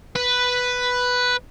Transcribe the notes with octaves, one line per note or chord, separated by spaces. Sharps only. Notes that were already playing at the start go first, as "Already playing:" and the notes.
B4